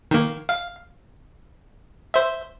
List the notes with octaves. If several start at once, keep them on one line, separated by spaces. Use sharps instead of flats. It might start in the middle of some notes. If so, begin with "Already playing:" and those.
D#3 A#3
F5
C5 E5